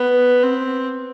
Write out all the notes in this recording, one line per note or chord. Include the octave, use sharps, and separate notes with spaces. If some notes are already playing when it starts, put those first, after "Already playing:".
Already playing: B3
C4